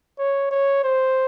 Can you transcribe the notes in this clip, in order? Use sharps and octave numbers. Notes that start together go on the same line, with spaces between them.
C#5
C#5
C5